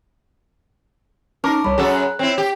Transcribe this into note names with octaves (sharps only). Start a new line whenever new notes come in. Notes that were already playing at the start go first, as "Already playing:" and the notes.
C#4 D#4 A#4 A5 C#6 D6
C2 G3 C#5 B5
F#2 F#4 G#4 A4
F#6
C4 E4 C#5
G4